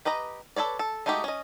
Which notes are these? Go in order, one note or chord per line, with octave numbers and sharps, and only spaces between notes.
G4 B4 D#5 A#5
A4 B4 C#5 D5
A4
G#3 A3 D#4 F#4 G4
C#4 D#5